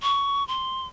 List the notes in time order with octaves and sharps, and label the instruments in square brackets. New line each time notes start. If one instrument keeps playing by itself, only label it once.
[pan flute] C#6
C6